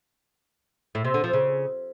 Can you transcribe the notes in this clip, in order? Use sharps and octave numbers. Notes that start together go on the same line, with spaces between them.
A2
C3
D3
F3
C#3